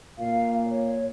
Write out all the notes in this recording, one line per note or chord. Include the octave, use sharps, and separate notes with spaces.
A#2 F5
C#5